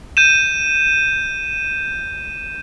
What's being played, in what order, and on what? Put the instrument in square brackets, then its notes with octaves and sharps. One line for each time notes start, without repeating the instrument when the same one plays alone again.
[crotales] G6 D#7 E7